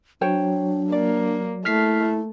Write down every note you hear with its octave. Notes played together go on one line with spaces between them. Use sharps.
F#3 D4 C5 C#5 G5
A#3 D5
A3 E4 F6 B6 C7